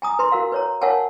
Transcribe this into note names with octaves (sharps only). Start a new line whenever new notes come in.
G#5 A#5 D#6
B4 A#5 C6
F#4 A#4 F5
B4 C#5 A#5
A#4 C#5 F5 F#5 G#5 A5